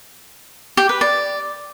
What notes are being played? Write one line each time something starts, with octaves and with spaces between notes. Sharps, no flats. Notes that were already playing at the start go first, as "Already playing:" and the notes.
G4
B4
D5